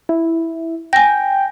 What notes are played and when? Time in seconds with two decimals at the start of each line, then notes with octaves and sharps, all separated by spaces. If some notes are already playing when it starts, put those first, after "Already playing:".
0.09 E4
0.93 G5 G#5 A#6